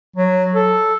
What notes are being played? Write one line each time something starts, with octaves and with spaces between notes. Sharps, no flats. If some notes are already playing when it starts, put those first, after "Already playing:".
F#3
A4